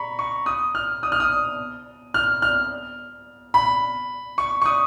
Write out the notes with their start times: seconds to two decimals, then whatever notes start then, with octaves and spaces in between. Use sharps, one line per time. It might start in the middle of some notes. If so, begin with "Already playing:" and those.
Already playing: A#5 B5 C#6
0.19 C#6
0.46 D#6
0.75 F6
1.03 D#6
1.12 F6
1.20 D#6
2.14 F6
2.42 F6
3.54 B5
4.38 C#6
4.62 C#6
4.66 D#6